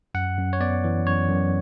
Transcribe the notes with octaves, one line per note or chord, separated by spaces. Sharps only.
F#2 F#5
F#2
C#5
B3 D5
E3
F#2 C#5
F#2